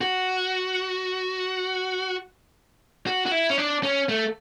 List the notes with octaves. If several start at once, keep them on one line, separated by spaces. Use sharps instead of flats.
F#4
F#4
F#4
E4
C#4
D4
C#4
A3